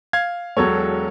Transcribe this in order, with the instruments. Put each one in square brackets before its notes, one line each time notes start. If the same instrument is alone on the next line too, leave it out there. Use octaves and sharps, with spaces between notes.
[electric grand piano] F5 G#6
[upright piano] E1 [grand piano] F#3 A4 C#5